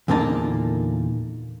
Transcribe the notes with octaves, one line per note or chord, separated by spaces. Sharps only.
E2 A#2 D3 A#3 D#4 A5